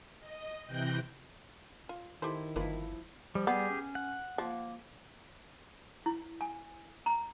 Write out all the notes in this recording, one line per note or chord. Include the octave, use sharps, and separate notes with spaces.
D#5
C3 E3 G5 F#6 G6 A#6
F4
D#3 E4 G4 A4 C5
G1 F3 A#3 E4 F4 B4
F3 G3
G3 B3 G4 G#4
C#4
F#5
F3 A#3
E4
G#5
A#5